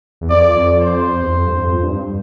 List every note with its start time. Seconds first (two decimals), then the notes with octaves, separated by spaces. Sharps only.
0.21 E2
0.30 F2 D5
0.55 F2
0.81 C5
1.22 E2
1.32 F2
1.47 G2
1.57 F2
1.83 G2